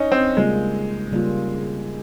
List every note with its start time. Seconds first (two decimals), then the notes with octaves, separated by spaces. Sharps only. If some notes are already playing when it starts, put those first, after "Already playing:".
Already playing: C#4 D#4
0.12 C4
0.37 C#3 G3 G#3 A#3 F4
1.12 C#3 G3 A#3 F4